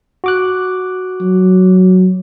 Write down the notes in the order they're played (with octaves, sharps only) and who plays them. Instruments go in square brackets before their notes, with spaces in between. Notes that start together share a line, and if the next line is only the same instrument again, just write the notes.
[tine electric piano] F#4 D6 F#6
[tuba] F#3